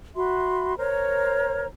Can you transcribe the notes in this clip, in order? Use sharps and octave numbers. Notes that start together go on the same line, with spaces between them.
F#4 E5 B5 C6
A#4 C5 C#5 A#5